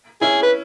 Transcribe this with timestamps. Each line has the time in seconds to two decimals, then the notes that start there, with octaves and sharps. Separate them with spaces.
0.21 C#4 E4 G#4
0.43 B4